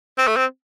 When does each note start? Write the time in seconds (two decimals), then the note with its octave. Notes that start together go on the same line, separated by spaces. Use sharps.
0.18 C4
0.27 A3
0.37 C4